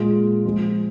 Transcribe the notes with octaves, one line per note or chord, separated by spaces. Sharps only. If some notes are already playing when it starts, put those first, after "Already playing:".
Already playing: A#2 G#3 F4 G#4
F3 G#3 C4 F4